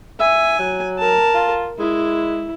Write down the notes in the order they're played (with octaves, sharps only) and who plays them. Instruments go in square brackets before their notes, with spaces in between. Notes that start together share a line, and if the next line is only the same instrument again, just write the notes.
[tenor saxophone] E5 [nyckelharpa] G#5
[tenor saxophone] F#3
[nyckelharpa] A#4 A5
[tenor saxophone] F4
[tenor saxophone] G#3 [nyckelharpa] E4